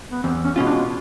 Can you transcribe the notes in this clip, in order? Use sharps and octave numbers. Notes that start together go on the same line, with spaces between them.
B3
E2 C4
C#4
B2 G#3 C#4 F4
D4